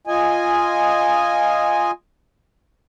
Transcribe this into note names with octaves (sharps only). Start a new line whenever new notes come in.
F4 D#5 G#5